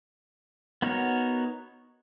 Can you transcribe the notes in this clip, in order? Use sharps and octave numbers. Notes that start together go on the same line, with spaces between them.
B3 D#4 F#4 A#4 C#5